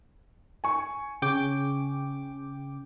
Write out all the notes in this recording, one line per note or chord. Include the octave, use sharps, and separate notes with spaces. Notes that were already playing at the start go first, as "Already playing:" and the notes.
G#5 C#6
C#3 G5 D6